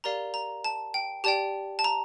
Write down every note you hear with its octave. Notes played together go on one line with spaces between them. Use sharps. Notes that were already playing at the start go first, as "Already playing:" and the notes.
G4 A#4 D5 F5 A#5
A#5
A5
G5
G4 D5 G5 A5
A5
A#5